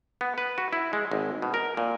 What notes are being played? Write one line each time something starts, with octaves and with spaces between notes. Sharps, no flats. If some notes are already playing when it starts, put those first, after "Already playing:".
B3
B4
F#4
E4
G#3
G#1
B2
A#4
A#2